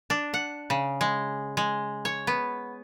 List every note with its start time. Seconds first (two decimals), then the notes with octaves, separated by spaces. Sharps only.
0.10 D4
0.34 F#5
0.70 C#3
1.01 G#3
1.57 G#3
2.05 C#5
2.27 B3